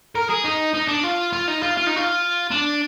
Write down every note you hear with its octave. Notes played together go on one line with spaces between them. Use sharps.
A#4
G#4
D#4
D#4
D4
F4
F4
D#4
F4
F4
D#4
F4
D4